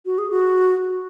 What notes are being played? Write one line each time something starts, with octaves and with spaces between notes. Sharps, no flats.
F#4
G#4
F#4